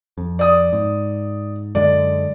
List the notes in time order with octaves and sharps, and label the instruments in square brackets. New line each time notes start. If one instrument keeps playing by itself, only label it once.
[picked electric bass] F2
[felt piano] D5 D#6
[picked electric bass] G#2
[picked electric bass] F#2 D3 G#3 [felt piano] D5